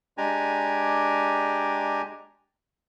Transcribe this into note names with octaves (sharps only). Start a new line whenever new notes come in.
G#3 D4 G4 G#5 A#5